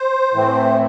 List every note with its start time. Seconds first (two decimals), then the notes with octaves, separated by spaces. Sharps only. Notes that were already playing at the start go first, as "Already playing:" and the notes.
Already playing: C5
0.33 A2 E3 A3 C4